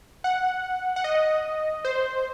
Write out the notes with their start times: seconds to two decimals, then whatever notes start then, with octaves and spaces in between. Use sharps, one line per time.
0.24 F#5
0.96 F#5
1.04 D#5
1.85 C5